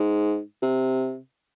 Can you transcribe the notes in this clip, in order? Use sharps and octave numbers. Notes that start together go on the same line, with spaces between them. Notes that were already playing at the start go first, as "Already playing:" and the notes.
Already playing: G#2
C3